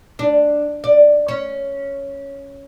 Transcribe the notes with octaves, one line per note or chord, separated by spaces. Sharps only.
D4
D5
C#4